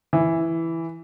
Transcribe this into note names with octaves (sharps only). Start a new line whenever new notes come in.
E3